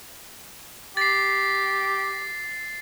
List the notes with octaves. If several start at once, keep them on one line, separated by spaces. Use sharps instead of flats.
G4 A6 C7